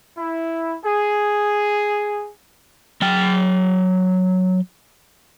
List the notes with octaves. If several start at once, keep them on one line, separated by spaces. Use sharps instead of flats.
E4
G#4
F#3 G5